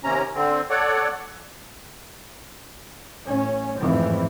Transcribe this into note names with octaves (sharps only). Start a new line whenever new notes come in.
D#2 C3 C#4 A#5
D3 C4
A4 C#5 D5 F#5
A1 C#4
A1 F2 G#2 D#3 E3 C4